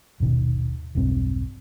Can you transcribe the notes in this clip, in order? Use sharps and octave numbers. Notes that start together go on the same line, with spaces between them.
D#1 G#1 B2 D#3
E1 B1 G2 C4